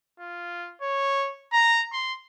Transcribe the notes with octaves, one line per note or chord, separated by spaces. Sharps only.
F4
C#5
A#5
C6